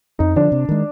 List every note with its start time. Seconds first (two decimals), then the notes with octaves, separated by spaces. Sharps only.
0.19 F2 D#4
0.36 D3 F3 D4
0.52 C3
0.69 D#3 G#3